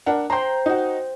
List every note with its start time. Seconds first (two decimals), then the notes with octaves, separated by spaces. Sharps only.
0.06 D4 A#4 F#5
0.30 C5 G5 A#5 C6
0.66 D#4 F#4